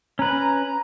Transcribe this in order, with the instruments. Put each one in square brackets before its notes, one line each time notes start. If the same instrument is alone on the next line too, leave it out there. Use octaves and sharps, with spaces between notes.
[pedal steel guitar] C#4 B4 [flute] A#5